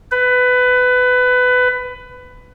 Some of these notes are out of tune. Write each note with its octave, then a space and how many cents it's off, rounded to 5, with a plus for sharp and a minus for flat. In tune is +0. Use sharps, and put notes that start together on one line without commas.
B4 +20